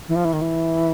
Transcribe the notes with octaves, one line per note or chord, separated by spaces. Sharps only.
E3
F3
E3
D#3
E3